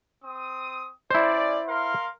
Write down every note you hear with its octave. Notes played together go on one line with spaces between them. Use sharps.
C4 D#6
C#4 E4 C5 D5
A#4 F5 C6